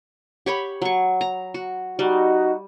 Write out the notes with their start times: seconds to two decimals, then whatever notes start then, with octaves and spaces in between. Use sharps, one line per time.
0.46 G4 C#5 B5
0.82 F#3 C#6
1.21 A#5
1.54 F#4
1.99 G3 D#4 F#4